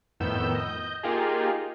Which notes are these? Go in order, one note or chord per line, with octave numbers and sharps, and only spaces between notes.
F2 A2 D#3 B3 E6 G6
D#5 G6
A#3 D#4 F4 G4 G#4